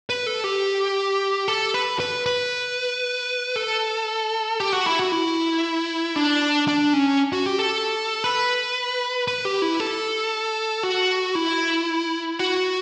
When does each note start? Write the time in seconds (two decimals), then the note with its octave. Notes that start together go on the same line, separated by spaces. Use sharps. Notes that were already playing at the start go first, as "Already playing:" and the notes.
0.10 B4
0.27 A4
0.44 G4
1.48 A4
1.74 B4
2.00 B4
2.26 B4
3.56 A4
4.60 G4
4.73 F#4
4.86 E4
4.99 F#4
5.12 E4
6.16 D4
6.68 D4
6.94 C#4
7.33 F#4
7.46 G4
7.59 A4
8.24 B4
9.28 B4
9.45 G4
9.62 E4
9.80 A4
10.83 F#4
11.35 E4
12.39 F#4